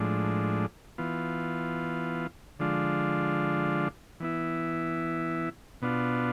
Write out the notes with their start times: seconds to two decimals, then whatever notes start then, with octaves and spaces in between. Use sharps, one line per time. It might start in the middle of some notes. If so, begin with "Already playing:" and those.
Already playing: A2 F3 G#3 D4
0.98 E3 B3 F4
2.59 D3 F3 G#3 D4 F4
4.20 E3 B3 E4
5.82 B2 B3 D4 F4